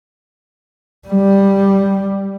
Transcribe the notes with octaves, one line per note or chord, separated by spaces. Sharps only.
G3